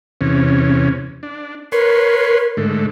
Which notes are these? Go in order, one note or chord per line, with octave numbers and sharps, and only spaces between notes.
E2 C3 C#4
D4
A#4 B4 C#5 C6
G#2 D3 A3